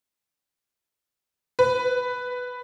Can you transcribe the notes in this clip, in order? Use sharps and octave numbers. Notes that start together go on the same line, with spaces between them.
B4